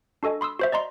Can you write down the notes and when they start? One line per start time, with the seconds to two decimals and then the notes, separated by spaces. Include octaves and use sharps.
0.23 D4 F#4 A4 D#5 G#5
0.41 B5 C6 D#6 E6
0.59 F#4 C5 E5
0.72 D5 D#5 A#5 C6